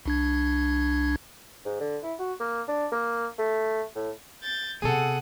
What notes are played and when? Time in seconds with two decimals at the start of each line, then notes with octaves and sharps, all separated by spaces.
0.06 C2 D4 G#6
1.65 G#2
1.80 D3
2.03 E4
2.19 F#4
2.40 A#3
2.68 D4
2.92 A#3
3.39 A3
3.96 A2
4.43 G6 A6
4.82 C3 B3 G#4 A4 F#5 D#7